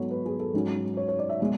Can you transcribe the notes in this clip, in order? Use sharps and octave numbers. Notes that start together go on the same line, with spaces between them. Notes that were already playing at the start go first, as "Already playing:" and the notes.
Already playing: G#2 F#3 B3 A4 C#5
B4
G#4
A4
G#2 F#3 C#4
C#5
C#5
D5
E5
B2 G#3 E5